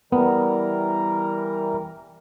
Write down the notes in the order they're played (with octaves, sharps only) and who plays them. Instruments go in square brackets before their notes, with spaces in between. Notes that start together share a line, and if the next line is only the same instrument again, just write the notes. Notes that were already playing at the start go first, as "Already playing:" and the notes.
[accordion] E3 G3 A#4 [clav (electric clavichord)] B3